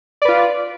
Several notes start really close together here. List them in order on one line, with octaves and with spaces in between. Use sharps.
D5 B4 F4